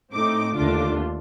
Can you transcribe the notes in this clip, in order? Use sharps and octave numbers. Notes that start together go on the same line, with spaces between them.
A2 A3 C4 D#4 D6
D#2 D3 A3 D4 F4 D6